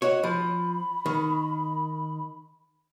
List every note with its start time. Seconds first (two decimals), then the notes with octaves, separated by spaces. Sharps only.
0.02 F#4 C#5 D#5
0.23 F3 B5
1.06 D#3